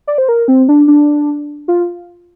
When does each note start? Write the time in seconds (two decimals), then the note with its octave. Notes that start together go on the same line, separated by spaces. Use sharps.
0.07 D5
0.18 C5
0.29 A#4
0.48 C4
0.69 D4
0.88 D4
1.68 F4